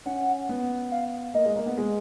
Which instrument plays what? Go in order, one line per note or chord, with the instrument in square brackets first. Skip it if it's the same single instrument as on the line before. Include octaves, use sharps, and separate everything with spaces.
[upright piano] C#4 [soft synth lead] F#5
[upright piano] B3
[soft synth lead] F5
[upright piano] A#3 [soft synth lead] D#5
[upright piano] G#3
A#3
B3
G#3